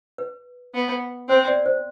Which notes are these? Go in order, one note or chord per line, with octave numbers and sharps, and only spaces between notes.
B4
B3
C4 C5
D5
C5